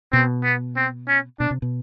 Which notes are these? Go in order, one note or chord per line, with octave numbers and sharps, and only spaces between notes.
B2 C4
B3
C4
C#4
B2 D4
C3
B2